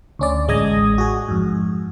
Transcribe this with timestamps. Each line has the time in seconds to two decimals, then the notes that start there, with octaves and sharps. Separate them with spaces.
0.19 D2 C#4 D5
0.48 A1 G#3 D#5 D#6 G#6 A#6
0.98 F#4 G#4
1.28 F2 G#2